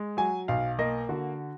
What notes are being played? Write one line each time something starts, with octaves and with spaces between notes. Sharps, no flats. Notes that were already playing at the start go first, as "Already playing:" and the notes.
Already playing: G#3
F#3 G#5
B1 F5
A#3 D#5
D3 F#4